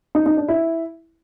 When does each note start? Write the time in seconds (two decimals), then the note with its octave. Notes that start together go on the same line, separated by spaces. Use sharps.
0.15 D#4
0.26 D#4
0.37 D4
0.48 E4